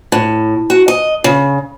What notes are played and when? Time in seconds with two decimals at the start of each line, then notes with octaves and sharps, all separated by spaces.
0.12 A2
0.70 F#4
0.88 D#5
1.24 C#3